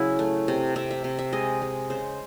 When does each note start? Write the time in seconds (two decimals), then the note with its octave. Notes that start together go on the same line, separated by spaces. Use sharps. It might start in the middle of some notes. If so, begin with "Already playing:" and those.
Already playing: C#3 F#3 E4 F#4
0.19 A3
0.48 C3
0.76 C3 E5
0.91 E5
1.04 C3
1.19 E5
1.33 G#3 D#5
1.62 G#3
1.90 C#3 C5